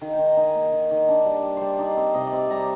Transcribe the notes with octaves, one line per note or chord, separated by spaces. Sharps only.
D#3 F5
G5
D#3
A#5
D#4 G#5
A#3
D#3
D#3
D4
G3
G3 C5
G3 C5 D5
D#4 D5
C4
C3 D#5
D5
C4
D5
G3 A#5